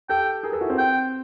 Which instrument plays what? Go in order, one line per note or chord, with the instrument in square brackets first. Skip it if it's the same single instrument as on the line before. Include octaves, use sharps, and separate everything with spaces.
[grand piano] G4 A4 [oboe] G5
[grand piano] G#4 A#4
A4 B4
E4 F#4
C4
[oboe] G5